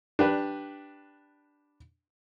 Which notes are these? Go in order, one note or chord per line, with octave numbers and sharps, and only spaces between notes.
D4 G4 B4